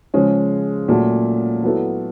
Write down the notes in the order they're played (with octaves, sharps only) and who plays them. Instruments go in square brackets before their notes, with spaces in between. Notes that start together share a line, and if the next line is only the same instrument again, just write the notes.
[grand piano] C#3 F3 G#3 C#4
A#2 F#3 A3 C#4
F#3 B3 E4 A4